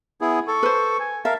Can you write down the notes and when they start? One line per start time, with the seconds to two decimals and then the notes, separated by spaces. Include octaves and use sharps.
0.21 B3 E4 G#4 G#5
0.48 A4 C#6
0.63 B4 C5
1.00 G#5
1.25 A#4 E5 F5 A5